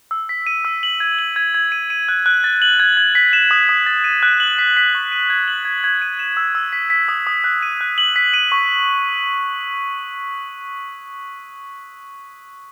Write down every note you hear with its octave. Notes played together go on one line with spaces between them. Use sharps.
E6
B6
D#7
E6
F#7
G#6
F#7
G#6
G#6
D#7
D#7
F#6
F#6
A6
F#7
G#6
G#6
B6
E7
D#6
D#6
A6
D#7
F#6
F#7
B6
B6
C#6
D#7
G#6
F#7
G#6
G#6
D#7
E7
E6
E6
B6
B6
D#6
D#6
F#6
D#7
F#6
F#7
B6
D#7
C#6